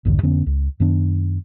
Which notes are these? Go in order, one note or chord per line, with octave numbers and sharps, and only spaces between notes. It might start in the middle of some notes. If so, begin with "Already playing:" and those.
A#1 E2 G2 D3
F2 D3 B3 C#4
C#2
F#2 D#3 B3 D4